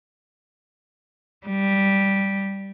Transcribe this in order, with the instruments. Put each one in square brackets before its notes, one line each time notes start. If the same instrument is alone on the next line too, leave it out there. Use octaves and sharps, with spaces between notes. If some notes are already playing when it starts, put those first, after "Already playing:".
[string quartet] G3